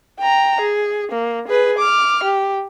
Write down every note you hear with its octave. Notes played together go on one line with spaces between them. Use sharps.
G5 A#5
G#4
A#3
G#4 B4
D6 F6
G4